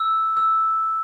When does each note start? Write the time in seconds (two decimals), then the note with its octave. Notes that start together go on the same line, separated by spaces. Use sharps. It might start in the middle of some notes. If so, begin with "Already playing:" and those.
Already playing: E6
0.37 E6